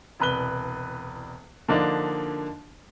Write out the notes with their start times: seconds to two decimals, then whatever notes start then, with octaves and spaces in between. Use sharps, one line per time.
0.20 E1 C2 B4 F#6 G7
1.68 D3 F3 A#3 D4 D#4